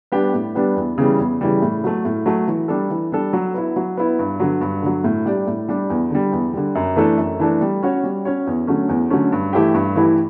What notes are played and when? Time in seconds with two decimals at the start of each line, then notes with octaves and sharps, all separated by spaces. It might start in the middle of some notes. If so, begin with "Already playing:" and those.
0.12 G3 B3 D4 G4
0.34 A2
0.55 G3 B3 D4 G4
0.76 E2
0.98 C#3 E3 G3
1.19 E2
1.41 C#3 E3 G3
1.62 A2
1.84 F#3 A3
2.05 A2
2.26 F#3 A3
2.47 E3
2.68 G3 D4 A4
2.90 E3
3.12 G3 D4 A4
3.33 F#3
3.54 B3 E4
3.76 F#3
3.97 B3 E4
4.19 G2
4.40 D3 F#3
4.61 G2
4.82 D3 F#3
5.04 A2
5.25 G3 D4 G4 D5
5.47 A2
5.68 G3 D4 G4 D5
5.90 E2
6.10 D3 G3
6.32 E2
6.53 D3 G3
6.75 F#2
6.96 E3 A3 D4 A4
7.18 F#2
7.40 E3 A3 D4 A4
7.61 G3
7.83 C#4 F#4 C#5
8.03 G3
8.25 C#4 F#4 C#5
8.47 E2
8.67 D3 F#3 A3 C#4
8.89 E2
9.10 D3 F#3 A3 C#4
9.32 G2
9.53 E3 A3 E4 G4
9.74 G2
9.96 E3 A3 E4 G4